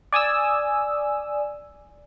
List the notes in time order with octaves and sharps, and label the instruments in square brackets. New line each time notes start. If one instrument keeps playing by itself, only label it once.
[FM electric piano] D5 G#5 D#6 E6